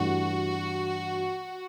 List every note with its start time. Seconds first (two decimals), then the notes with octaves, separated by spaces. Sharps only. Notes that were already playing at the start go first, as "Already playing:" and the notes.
Already playing: G2 E3 A3 D4 F#4